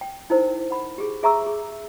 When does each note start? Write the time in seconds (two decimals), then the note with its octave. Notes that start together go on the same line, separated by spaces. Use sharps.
0.01 G5
0.30 D#4 E4 A#4 C5
0.71 F#5 B5
0.98 G4 G#4
1.23 G#4 E5 A#5 C#6 E6
1.46 G#4